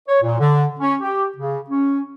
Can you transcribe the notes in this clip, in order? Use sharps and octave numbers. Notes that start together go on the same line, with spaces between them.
C#5
A#2
D3
C#4
G4
C#3
C#4